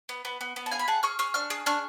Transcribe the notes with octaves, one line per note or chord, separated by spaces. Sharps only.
B3
B3
B3
B3
A5
G#4 F5 G#5
B5
G#4 F#5 A5
G#4 C#6 F6
G#4 C#6 F6
D4 C#6 F6
G#4
D4 C#6 F6